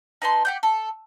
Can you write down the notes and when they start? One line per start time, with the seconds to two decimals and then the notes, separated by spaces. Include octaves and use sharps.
0.22 D#4 B4 A5 C6
0.45 G4 F#5 G6
0.63 A4